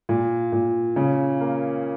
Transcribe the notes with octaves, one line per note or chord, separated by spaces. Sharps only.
A#2
A#2
C#3
A#3